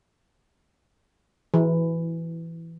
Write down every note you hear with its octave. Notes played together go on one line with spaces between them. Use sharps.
E3